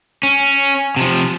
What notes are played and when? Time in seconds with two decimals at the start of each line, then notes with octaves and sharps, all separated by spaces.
0.23 C#4
0.96 C3 F3